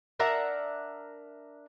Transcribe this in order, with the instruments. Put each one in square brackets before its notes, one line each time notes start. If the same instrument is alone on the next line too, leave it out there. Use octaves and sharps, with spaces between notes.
[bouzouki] D4 A#4 E5 F#5